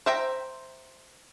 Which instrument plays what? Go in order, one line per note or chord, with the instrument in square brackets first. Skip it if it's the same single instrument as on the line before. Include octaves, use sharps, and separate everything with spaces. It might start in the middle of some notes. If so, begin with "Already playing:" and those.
[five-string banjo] C5 E5 G5 A#5